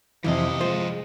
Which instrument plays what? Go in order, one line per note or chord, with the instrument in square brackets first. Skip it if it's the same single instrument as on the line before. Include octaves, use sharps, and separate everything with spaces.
[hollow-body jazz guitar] F2 E3 [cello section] C3 [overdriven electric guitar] F3 D#5
[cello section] G#3 [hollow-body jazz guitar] F4 C5